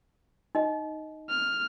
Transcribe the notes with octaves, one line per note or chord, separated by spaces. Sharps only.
D#4 D#5
F6